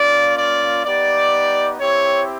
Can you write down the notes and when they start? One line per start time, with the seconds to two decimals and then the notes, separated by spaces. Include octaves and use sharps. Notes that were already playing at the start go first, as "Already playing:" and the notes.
Already playing: A#3 C#4 F4 D5
0.37 D5
0.85 B3 D#4 G4 D5
1.79 C4 E4 G4 C#5